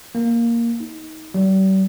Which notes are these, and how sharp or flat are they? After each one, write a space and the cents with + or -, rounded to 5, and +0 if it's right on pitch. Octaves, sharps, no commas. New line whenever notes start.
A#3 +0
D#4 +20
G3 -40